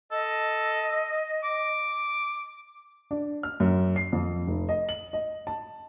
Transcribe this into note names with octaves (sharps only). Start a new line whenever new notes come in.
A4 D#5
D6
D4
F6
F#2
C7
F2
F1
D#5
F#7
D#5
A5